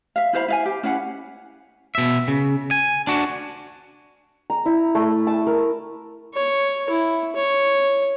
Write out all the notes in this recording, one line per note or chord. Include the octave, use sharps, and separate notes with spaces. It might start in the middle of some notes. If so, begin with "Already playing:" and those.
E5 F5
E4 C5 F5 B5
E4 F5 G#5
G4
C#4 E4 F5 F#5
B2 E5
C#3
G#5
D4 F#4
A#5
E4
A3
A5
A#4
C#5
E4
C#5